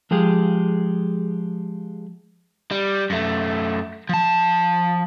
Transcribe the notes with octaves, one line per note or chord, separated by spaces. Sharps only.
F3 G#3 G4 G#4
G3
F#2 A3
F3 A5